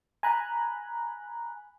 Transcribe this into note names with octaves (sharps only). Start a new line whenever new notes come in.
G#5 A#5 B5 F#6